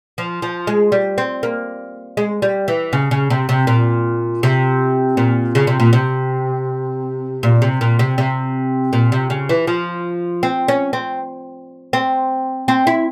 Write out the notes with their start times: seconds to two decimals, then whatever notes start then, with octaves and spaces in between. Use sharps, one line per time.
0.18 F3
0.42 F3
0.67 G#3
0.92 G3
1.18 C4
1.43 A#3
2.17 G#3
2.42 G3
2.68 E3
2.93 C#3
3.11 C#3
3.30 C3
3.49 C3
3.67 A#2
4.43 C3
5.17 A#2
5.55 C#3
5.67 C3
5.80 A#2
5.93 C3
7.43 A#2
7.62 C3
7.81 A#2
7.99 C3
8.18 C3
8.93 A#2
9.12 C3
9.30 C#3
9.49 E3
9.67 F3
10.43 C4
10.68 C#4
10.93 C4
11.93 C4
12.68 C4
12.87 E4